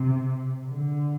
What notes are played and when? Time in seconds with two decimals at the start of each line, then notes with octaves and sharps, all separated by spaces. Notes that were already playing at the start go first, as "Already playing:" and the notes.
Already playing: C3
0.69 D3